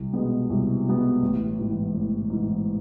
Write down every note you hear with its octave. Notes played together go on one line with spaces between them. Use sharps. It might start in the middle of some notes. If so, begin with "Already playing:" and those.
Already playing: C2
B2 G#3 B3
C2
B2 G#3 B3
A1
G#2 E3
A1
G#2 E3